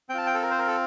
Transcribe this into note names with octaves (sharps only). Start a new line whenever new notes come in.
C4 F4 G5 A5
G5
A4
A#4
C5
A#4
A4